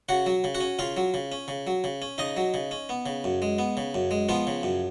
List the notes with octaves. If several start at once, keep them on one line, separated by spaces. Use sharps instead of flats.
C#3 F#4 F#5
F#3
C#3
F#4 F#5
C#4
C#3 F4 F5
F#3
C#3
C#4
C#3
F#3
C#3
C#4
C#3 D#4 D#5
F#3
C#3
C#4
B3
C#3
F#2
G#3
B3
C#3
F#2
G#3
F3 B3 F4
C#3
F#2